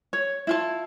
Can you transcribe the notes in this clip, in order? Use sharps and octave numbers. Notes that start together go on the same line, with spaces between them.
C#5
E4 F4 A5